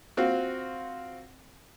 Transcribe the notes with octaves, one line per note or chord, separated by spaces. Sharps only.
C4 F4 F#4